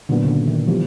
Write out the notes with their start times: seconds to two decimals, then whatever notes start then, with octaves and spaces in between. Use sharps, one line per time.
0.09 A#2 D3 F#3 B3 D4
0.25 C#3
0.28 D3
0.48 D#3
0.67 E3 F3 G3 B3